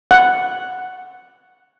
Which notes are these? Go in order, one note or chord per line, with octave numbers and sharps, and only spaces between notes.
F#5